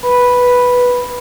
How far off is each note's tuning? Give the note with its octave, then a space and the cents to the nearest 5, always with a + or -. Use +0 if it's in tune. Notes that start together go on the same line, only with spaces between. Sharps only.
B4 -5 B5 +0